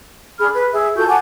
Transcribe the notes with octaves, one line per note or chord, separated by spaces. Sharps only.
D4 G#4 B5 F6
B4
G#4 E5 E6
F4 F#4 A4 G6
F#5 G#5 A5 D6